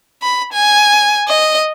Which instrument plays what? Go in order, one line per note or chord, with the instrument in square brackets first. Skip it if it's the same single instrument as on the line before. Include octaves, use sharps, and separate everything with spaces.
[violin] B5
G#5
D#5